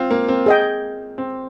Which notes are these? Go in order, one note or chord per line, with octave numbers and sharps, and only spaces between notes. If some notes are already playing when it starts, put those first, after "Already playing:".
Already playing: C4 F4
A#3
C4
G#4 D#5 G5
C4